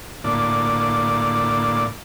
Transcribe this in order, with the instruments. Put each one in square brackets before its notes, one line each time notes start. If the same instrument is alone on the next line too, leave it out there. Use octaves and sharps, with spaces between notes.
[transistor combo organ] A2 D3 A#3 D5